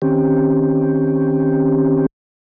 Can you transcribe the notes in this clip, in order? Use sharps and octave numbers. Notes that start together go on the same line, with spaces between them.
D#3 C4 C#4 G4